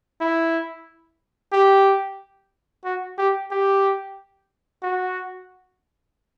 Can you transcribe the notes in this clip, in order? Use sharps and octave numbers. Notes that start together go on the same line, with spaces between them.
E4
G4
F#4
G4
G4
F#4